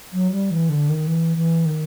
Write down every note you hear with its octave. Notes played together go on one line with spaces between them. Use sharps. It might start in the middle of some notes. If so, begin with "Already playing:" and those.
F#3
G3
E3
D3
D#3
E3
E3
D#3